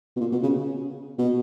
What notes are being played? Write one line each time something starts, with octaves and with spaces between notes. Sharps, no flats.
B2
A#2
B2
C#3
B2